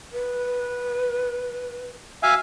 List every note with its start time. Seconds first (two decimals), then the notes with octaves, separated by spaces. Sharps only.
0.12 B4
2.23 F#4 E5 F5 G#5